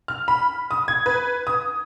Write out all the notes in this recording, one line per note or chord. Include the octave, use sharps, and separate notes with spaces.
F6
B5
D#6
G#6
B4
D#6